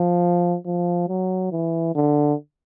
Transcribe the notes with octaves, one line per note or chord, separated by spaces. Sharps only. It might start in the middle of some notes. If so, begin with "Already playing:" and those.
Already playing: F3
F3
F#3
E3
D3